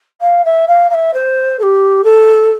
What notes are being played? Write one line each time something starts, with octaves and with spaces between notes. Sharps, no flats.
F5
E5
F5
F5
E5
C5
A4
G4
A4